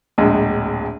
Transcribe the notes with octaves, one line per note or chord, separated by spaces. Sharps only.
D1 A#1 G#3